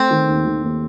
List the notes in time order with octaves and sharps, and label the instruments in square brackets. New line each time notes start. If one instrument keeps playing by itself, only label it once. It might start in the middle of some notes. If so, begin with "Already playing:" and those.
Already playing: [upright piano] A3 [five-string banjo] C4
[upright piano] D#3
D#2
D#3
D#2